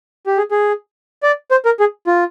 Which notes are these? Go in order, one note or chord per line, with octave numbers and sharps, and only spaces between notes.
G4
G#4
G#4
D5
C5
A#4
G#4
F4